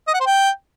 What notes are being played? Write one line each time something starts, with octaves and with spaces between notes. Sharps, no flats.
D#5
F#5
C5
G5